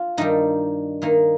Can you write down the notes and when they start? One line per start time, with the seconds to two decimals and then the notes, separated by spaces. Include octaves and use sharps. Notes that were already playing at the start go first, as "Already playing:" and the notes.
Already playing: F4
0.17 G2 D#3 G3 D#4
1.02 D#3 A#3 D#4